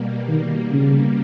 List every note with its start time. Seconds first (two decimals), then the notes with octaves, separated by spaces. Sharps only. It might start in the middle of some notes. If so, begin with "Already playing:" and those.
Already playing: B2 G3 A#3
0.28 D#3
0.71 C#3